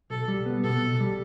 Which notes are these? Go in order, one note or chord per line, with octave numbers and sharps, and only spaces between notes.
B1 A4
G3
B3
B2 A4
B1
G3